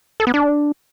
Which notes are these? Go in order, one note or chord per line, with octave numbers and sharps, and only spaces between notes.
A4
B3
D4